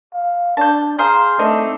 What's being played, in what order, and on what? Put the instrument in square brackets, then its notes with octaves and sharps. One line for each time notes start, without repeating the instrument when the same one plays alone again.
[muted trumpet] F5
[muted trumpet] D4 [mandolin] A5 G6
[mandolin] G#4 C5 F5 [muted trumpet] A#5
[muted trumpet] A3 [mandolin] C4 D4 D#4